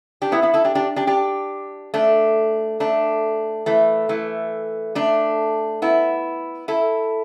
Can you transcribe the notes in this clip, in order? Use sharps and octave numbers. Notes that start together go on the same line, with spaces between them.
D4 G4
B3 E4
B3 E4
E4 A4
D4 G4
D4 G4
D4 G4
D4 G4
A3 D4
A3 D4
E3 A3
E3 A3
A3 D4
B3 E4
E4 A4